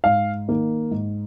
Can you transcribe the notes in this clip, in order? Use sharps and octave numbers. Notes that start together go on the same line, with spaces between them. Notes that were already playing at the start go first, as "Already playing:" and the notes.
G#2 F5
D#3 A#3
G#2